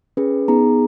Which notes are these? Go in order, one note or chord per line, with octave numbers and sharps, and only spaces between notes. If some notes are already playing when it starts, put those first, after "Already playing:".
C#4 G#4 B4
B3 D#4 G#4 A#5